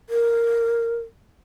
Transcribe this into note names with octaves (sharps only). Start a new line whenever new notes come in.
A#4